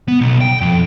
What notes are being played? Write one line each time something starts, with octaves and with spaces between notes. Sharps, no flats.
B3
B1
G5
F2